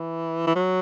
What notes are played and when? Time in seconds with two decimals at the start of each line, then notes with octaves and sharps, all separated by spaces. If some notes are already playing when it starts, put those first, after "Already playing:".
Already playing: E3
0.47 E3
0.55 F#3